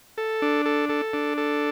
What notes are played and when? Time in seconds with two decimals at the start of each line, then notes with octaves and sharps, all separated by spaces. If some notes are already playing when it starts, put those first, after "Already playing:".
0.18 A4
0.42 D4
0.66 A4
0.89 A4
1.13 D4
1.38 A4